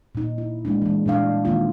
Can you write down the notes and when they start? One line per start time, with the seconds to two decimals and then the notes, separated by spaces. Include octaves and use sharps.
0.15 A#2 D#4
0.38 E4
0.65 G#3 A#3 D4
0.82 E3 G#3
1.06 A#2 G3 D4 F5
1.45 D#3 G#3 A#3 E4 F4